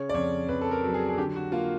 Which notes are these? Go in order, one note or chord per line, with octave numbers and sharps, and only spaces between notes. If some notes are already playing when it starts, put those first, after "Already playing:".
Already playing: C#3 C#5
D5
F2 C#5
F2 B4
A4
A#4
F#3
G#4
G#4
D3 G4
F#4
A#3 F4